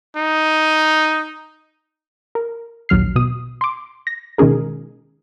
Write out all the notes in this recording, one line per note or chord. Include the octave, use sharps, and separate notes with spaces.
D#4
A#4
A#1 D#2 F#3 F6 C7
B2 D#6
C6 D6
A#6
B2 D#3 G#3 C#4 G#4 A#4